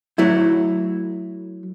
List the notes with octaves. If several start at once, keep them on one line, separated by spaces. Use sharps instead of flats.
F#3 A3 E4